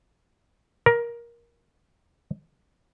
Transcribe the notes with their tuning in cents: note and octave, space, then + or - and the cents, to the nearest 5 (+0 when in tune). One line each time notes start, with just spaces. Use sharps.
A#4 +15